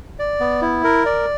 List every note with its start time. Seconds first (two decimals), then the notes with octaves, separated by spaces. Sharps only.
0.19 D5
0.40 B3
0.62 E4
0.84 A#4
1.06 D5